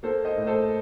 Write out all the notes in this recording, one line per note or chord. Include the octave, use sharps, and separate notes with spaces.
A#3 A4 C5
C5 D#5
A2
A4 C5